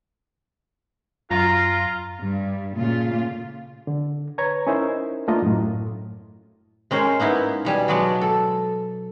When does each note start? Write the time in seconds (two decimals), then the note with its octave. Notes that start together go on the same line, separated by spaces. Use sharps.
1.31 F#2 F4 A#5
2.19 G2
2.74 A#2 C#3 A3 F4
3.87 D3
4.38 B4 C#5 A#5 G#6
4.67 C#4 D#4 E4 A#4 C5 D#5
5.28 A3 A#3 D4 F4 D#5 A#5
5.42 F#2 A2
6.91 G#3 C#4 A#4 C5
7.20 A#3 B3 D#4 E4
7.65 B2 G3 G#5
7.88 F#3 G#3 B3 D5 A5
8.21 A4